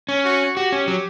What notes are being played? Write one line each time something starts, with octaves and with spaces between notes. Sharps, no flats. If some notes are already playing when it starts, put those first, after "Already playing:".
C#4
F#4
F#4 G4
C#4
F#3